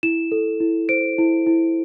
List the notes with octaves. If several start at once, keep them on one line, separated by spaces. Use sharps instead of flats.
E4 E7
A4
E4
C5 D7
E4
E4